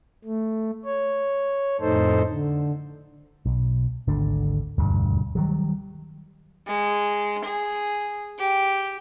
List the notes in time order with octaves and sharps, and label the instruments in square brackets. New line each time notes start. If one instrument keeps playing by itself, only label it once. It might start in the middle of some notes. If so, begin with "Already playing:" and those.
[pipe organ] A3
C#5
F2 A2 D#4 A4 C5
D3
[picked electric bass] B1
G#1 D2 D3
E1 D2 G2
D#3 F#3 G3
[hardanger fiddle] G#3
G#4
G4